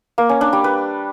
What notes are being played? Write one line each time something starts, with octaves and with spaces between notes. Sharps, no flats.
A#3
C#4
D4
G3
B4